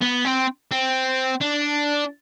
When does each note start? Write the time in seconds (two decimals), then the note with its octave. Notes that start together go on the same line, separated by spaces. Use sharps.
0.02 B3
0.25 C4
0.72 C4
1.41 D4